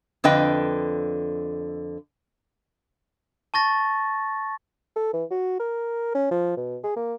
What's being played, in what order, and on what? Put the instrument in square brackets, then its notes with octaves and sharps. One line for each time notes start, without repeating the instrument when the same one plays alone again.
[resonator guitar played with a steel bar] F2 D3 B4 D#5 G5
[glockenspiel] A5 C#6 A6 A#6
[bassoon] A4
E3
F#4
A#4
C#4
F3
B2
G#4
A#3